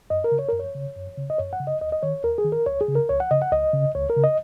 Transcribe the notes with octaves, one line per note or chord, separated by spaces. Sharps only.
F#2 D#5
A#4
C#3
C#5
F#2 A#4
C#5
C#3
F#2
C#3
D#5
F#2 C#5
F#5
C#3
D#5
D#2 D#5
D#5
D#3 C#5
D#2 A#4
G#4
D#3
A#4
C#2 C#5
G#4
C#3
A#4
C#2 C#5
F#5
C#3 D#5
F#5
C#2 D#5
C#3
C#2 C#5
A#4
C#3
D#5